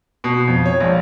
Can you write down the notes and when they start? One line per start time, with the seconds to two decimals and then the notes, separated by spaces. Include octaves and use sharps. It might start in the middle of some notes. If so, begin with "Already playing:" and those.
0.24 B2
0.48 F2
0.66 C#5
0.80 A#1